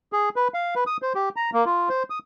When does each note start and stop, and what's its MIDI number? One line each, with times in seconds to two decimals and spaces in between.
0.13 0.29 68
0.36 0.48 71
0.54 0.75 77
0.75 0.84 71
0.87 0.97 87
1.02 1.13 72
1.15 1.29 67
1.36 1.50 82
1.53 1.65 58
1.66 1.89 65
1.89 2.03 72
2.10 2.19 87